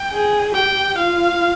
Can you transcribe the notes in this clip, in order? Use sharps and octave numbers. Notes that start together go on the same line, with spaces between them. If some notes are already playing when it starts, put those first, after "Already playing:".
Already playing: G5
G#4
G4 G5
F4 F5